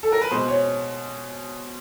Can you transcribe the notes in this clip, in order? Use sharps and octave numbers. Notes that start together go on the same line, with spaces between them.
A4
A#4
B4
B2 G#3 C5
C#5